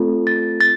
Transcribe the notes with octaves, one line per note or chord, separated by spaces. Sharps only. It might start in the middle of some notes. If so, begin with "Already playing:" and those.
Already playing: A3 C4 F4 A4
A6
A6